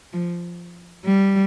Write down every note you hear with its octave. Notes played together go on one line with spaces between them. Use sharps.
F3
G3